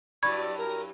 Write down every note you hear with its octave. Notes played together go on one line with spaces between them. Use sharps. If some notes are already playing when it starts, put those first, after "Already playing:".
G2 F#3 E4 D5 B5 C#6 G#6
A#4